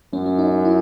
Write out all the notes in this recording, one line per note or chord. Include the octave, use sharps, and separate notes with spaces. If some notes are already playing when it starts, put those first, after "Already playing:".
F#2 C#4
C#4
D#4
D#4
E4